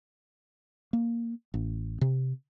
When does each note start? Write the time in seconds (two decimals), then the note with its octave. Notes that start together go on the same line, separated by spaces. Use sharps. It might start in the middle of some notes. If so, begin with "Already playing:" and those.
0.93 A#3
1.54 A1
2.01 C3